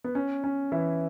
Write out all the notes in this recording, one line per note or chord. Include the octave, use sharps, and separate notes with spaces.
B3
C#4
C#4
E3 E4